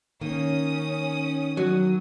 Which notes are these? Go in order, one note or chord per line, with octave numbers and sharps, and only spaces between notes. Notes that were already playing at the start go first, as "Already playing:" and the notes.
D#3 A#3 C#4 D#6
F#3